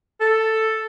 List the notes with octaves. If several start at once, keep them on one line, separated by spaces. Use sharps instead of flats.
A4